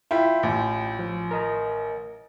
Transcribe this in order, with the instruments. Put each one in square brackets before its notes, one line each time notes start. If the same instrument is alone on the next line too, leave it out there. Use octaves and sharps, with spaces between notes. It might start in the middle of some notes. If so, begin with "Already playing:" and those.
[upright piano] E4 [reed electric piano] F4 G5 B5
[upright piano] A1
[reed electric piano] F3
A#4 D#5 A#5